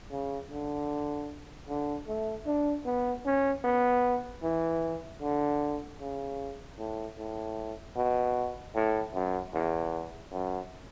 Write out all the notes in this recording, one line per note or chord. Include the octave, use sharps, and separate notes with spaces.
C#3
D3
D3
A3
D4
B3
C#4
B3
E3
D3
C#3
A2
A2
B2
A2
F#2
E2
F#2